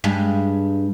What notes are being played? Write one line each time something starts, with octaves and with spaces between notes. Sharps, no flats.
G2 G#3